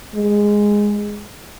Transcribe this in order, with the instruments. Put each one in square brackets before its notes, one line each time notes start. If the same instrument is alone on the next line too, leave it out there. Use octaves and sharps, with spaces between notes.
[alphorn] G#3